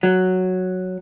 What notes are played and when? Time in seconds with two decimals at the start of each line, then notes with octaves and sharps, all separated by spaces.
0.03 F#3